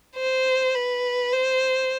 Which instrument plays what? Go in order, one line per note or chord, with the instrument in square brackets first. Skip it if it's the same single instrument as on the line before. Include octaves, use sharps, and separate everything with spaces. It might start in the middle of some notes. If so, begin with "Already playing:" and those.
[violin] C5
B4
C5